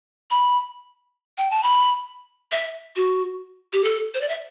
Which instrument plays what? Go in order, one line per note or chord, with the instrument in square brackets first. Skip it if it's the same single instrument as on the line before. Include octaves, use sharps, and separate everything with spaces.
[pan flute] B5
G5
A5
B5
E5
F#4
G4
A4
C5
D5
E5